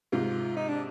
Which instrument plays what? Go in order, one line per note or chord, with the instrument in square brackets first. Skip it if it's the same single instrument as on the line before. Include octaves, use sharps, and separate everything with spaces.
[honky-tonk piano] G#2 C3 [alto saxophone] F4
[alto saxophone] D#4
D4